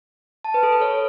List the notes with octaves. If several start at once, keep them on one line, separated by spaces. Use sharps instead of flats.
A5
B4
A4
B4
C#5